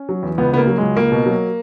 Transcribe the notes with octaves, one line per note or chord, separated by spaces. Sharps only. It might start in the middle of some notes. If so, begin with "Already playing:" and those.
Already playing: C#4
F#3
E2
C#2 B3
C#3 A#3 B3
F#3
C#2 G#3
C#2 A#3
B2
F#3